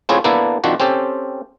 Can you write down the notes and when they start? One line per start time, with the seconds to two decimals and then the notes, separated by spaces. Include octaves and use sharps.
0.09 A3 C4 E4 F4 G#4 C#5
0.24 A#3 B3 D4 E4 A4
0.64 D#3 F3 C4 D4 F#4
0.80 C4 C#4 G4 A4 C5